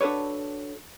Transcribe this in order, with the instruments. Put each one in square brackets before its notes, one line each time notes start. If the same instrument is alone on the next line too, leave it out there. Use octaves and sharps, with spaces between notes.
[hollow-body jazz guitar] D4 F#4 A4 B4 C#5